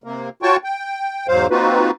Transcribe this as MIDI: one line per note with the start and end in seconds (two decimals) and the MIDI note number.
0.04 0.29 48
0.04 0.29 58
0.43 0.57 65
0.43 0.57 66
0.43 0.57 73
0.43 0.57 79
0.43 0.57 81
0.43 0.57 85
0.64 1.27 79
1.28 1.47 40
1.28 1.47 44
1.28 1.47 54
1.28 1.47 72
1.28 1.47 77
1.51 1.91 58
1.51 1.91 60
1.51 1.91 63
1.51 1.91 65
1.51 1.91 66
1.51 1.91 71